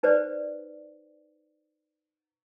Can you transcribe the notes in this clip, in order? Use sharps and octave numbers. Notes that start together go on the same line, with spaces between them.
D#4 B4 C5 D5